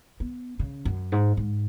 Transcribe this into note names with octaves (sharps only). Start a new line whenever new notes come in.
B3
C#3
F#2
G#2
G#2